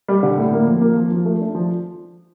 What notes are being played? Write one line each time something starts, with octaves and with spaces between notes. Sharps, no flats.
G3
D3
A2
A#3
F3
A#3
F3
F3
A3
D4
F3